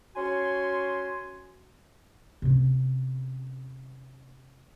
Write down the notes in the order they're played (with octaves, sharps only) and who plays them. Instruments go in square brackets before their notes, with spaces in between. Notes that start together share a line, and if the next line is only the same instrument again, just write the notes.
[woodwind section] C#4 F#4 G#5 C6
[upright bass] C3 C#4